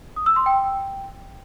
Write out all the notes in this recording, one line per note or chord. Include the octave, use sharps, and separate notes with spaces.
D#6
E6
C6
G5